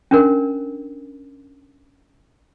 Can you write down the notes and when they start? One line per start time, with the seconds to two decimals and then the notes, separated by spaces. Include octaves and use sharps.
0.11 C#4 D4 A#4